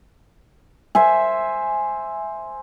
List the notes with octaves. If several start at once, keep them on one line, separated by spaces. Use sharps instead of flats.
C5 E5 G#5